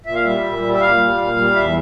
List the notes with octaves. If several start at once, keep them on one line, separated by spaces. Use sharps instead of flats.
A#2 E5
F5
G3 E5
A#2
G3
E5
A#2 F5
G3
A#2
G3
E2 E5